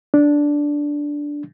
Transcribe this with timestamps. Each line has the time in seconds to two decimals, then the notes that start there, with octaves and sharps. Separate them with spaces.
0.14 D4